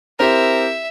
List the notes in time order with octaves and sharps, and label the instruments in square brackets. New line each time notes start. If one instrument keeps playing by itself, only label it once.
[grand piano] C4 E4 G4 [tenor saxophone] A#4 [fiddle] E5